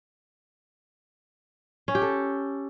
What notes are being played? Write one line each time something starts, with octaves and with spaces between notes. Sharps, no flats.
C#4
G4
A4